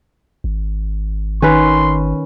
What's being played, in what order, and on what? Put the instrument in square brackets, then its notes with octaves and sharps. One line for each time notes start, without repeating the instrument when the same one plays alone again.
[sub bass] G#1
[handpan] D#3 [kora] C#4 B4 [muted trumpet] C6